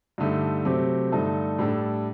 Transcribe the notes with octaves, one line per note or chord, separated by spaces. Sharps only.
G2 D3 A3 D#4 G4
C3 F#3 A3 C4 G4
G2 D3 A3 D#4 A4
A2 G3 D4 A4